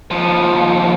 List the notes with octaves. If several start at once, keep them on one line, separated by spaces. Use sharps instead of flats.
D#2 F3